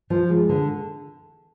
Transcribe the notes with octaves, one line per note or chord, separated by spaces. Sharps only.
F3
G#3
D3